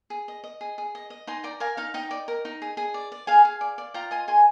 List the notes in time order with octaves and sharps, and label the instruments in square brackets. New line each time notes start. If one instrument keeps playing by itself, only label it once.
[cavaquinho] G#4
D#5
D#5
G#4
G#4
D#5
D#5
D#4 G#5 C6
D5 G5 A#5
A#4 F5 G#5
D#4 F5
D#4 D#5 G5
D5
A#4
D#4
G#4
G#4
D5
D5
G#4 F5 G#5
G#4
D5
D5
F4 G5 A#5
D#5 G#5 C6
G#4 G#5 C6